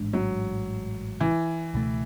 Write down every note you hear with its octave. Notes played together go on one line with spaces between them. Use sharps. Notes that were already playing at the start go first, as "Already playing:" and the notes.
Already playing: A1 G#2 G#3 D4
F#3
E3
C#2 B2 A3